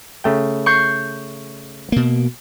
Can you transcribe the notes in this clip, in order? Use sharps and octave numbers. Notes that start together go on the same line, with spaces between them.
C#3 A3 G5
C#6 G6 C7
B2 A#3